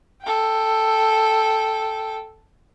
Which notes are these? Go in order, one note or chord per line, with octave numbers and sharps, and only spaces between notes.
A4 G5